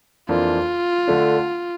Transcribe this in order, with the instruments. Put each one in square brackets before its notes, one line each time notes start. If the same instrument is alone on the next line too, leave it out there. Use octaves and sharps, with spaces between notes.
[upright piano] F2 E3 A#3 D4 [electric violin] F4
[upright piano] D3 A3 D4